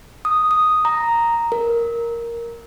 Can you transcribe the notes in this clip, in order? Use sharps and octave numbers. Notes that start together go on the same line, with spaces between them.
D#6
D#6
A#5
A#4